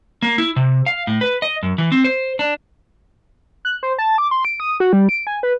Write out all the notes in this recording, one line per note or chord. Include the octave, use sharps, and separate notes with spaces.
A#3
E4
C3
F5
A2
B4
D#5
F#2
E3
C4
C5
D4
F#6
C5
A5
D6
C6
D7
D#6
F#4
G3
D7
G#5
B4